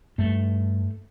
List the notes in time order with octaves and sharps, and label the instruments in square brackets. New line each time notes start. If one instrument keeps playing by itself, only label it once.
[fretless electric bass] G2 A3